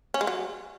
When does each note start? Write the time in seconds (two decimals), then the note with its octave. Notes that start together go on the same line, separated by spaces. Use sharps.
0.14 C#4
0.21 G#3
0.27 F#3